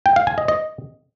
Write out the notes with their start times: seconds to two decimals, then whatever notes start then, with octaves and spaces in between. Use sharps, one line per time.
0.06 G5
0.16 F5
0.27 G#5
0.38 D#5
0.48 D#5